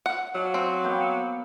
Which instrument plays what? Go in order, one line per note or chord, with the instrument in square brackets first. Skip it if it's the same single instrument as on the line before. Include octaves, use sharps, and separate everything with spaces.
[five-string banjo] F#5
[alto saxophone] F#3 [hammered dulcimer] F5 A5 D6
[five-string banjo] C4
[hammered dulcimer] A#3 B3 G5